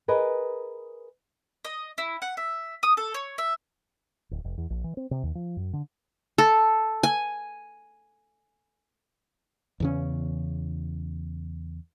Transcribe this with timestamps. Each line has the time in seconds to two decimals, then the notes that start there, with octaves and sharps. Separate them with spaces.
0.08 G#4 A#4 B4 D#5
1.65 D#5
1.98 E4
2.22 F#5
2.37 E5
2.83 D#6
2.97 A4
3.14 C#5
3.38 E5
4.31 D1
4.44 F1
4.58 E2
4.70 A#1
4.84 E3
4.97 C4
5.11 C3
5.23 D#2
5.35 F3
5.57 F#2
5.73 D3
6.38 A4
7.03 G#5
9.80 E2 C#3 C#4